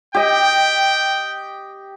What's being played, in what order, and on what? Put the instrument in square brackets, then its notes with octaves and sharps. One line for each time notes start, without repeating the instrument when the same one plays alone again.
[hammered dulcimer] G4 D#5 [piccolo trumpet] G5